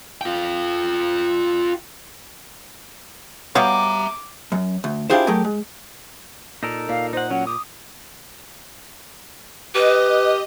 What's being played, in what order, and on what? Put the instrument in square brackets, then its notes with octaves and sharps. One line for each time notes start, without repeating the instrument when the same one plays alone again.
[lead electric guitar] F4 G5
[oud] G3 F5 [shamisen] B3 F#4 C#5 [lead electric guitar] E5 A#5 [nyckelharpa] D6
[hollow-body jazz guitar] F#2
D2
D4 E4 F4 G4 G#4 C5
F#3 A3 G4 G#4 A#4
G#3
[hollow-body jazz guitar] A#2 [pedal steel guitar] D#4 A4 A#4
[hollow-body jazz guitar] A#2 [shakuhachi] F5
[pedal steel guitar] D#4 F#5 [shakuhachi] C5
[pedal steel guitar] F#3 C#4 [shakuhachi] F#5
[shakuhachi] D6 [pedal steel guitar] D#6
[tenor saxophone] G4 [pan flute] B4 [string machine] D#5